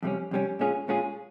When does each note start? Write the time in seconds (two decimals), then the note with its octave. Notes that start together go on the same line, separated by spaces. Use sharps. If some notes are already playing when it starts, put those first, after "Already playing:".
0.03 F2 C3 G3 C#4
0.31 F2 C3 G3 C#4
0.59 A#2 G#3 C#4 F4 G#4
0.88 A#2 G#3 C#4 F4 G#4